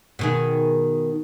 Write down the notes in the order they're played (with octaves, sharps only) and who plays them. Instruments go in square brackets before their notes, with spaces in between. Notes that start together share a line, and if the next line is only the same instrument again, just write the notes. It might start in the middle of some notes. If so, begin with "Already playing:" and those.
[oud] B2 D#3 G#4